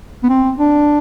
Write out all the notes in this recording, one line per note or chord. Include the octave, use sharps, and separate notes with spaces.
B3
C4
D4